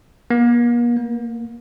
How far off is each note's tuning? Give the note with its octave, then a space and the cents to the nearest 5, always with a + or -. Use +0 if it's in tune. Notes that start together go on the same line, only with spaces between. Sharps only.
A#3 +45
A#3 -15